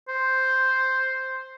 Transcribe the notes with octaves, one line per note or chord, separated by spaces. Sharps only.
C5